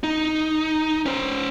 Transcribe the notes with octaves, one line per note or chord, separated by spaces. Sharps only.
D#4
C#4 C5